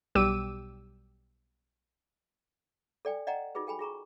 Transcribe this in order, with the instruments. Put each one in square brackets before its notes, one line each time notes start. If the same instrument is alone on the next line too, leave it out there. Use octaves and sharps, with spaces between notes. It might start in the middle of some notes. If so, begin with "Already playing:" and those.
[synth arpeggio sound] B1 G3 G4 D6 E6 D#7
[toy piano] A4 D5 G5 G#5
D5 D#5 F#5 G5 A#5
D#4 F4 F#4 G#4 B4
A4 G5 G#5 B5
F4 G#4 A#5 C#6